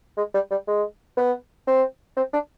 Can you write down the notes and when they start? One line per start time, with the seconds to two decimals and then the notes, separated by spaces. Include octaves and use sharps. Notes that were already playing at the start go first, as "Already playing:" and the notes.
0.17 G#3
0.34 G3
0.51 G3
0.68 G#3
1.17 B3
1.67 C4
2.17 C4
2.33 D4